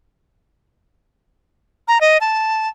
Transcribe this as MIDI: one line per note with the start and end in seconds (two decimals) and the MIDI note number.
1.88 2.01 82
2.01 2.18 75
2.21 2.68 81